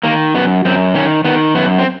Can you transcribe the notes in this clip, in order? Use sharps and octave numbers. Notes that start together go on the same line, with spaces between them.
D#3 A#3
F#2 B3
F#2 C4
D#3 C#4
D#3 B3
F#2 B3
C4